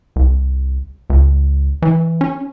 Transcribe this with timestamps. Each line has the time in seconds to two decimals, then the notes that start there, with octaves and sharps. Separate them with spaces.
0.16 C2
1.10 C#2
1.82 E3
2.21 C#4